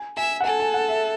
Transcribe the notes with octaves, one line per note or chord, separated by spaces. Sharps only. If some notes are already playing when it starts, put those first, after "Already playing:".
Already playing: G#5
E5 G#5
F#5
A4 G#5
G#5
F#5
E5